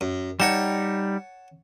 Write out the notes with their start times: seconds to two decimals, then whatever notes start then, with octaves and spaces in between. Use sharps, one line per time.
0.01 F#2
0.40 G3 D#4 C#5 F#5 A5